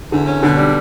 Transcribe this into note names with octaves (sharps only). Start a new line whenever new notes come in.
E2 D3
C#4
B2 D3
G3